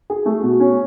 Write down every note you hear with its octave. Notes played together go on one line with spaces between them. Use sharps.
G#4
A3
B2
C#4